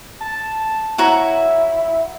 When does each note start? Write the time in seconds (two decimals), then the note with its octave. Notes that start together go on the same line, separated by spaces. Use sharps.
0.21 A5
0.98 E4 F#4 C#5 A#5